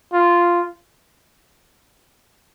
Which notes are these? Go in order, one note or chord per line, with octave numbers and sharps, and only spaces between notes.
F4